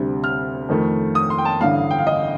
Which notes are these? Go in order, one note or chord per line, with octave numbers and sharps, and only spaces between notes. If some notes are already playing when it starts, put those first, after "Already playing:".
Already playing: D2 C3 G3
F6
F2 D#3 A3
D#6
C6
G5
A5
A1 G2 D3 F5
G5
F5
D#5